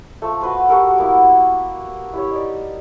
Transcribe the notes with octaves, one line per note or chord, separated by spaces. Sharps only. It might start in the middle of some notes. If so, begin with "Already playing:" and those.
F3 A3
F#4 B4 C5
F#4 G4 A4 A#4
A#3 B3 E4
E4 G4 C#5
D#4 D5